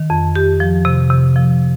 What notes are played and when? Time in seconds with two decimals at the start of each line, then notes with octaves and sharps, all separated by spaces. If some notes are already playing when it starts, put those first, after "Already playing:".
Already playing: D#3
0.10 F2
0.36 G4
0.60 F3
0.85 C3
1.10 C3
1.36 F3